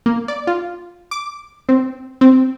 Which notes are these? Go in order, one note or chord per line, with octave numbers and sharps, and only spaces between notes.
A#3
D5
F4
D6
C4
C4